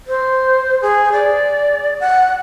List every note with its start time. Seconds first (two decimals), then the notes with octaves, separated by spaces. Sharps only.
0.07 C5
0.82 G#4
1.12 D5
2.00 F#5